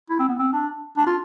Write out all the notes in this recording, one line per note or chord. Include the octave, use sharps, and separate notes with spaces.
E4
C4
B3
C4
D4
D4
F4